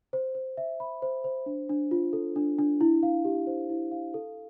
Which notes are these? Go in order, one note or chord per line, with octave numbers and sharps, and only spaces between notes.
C5
C5
E5
B5
C5
C5
D4
D4
F4
A4
D4
D4
E4
F5
G4
C5
E4
F5
A4